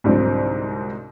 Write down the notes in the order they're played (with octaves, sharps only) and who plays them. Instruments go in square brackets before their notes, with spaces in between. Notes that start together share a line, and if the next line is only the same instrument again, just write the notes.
[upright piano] C2 G#2 D3 F#3 C4